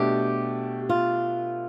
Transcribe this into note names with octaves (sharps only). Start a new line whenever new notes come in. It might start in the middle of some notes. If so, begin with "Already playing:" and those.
Already playing: B2 A3 D4 G4
F4